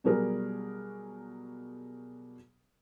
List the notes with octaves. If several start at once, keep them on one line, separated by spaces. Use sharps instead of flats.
B2 F#3 G3 G#4 A#4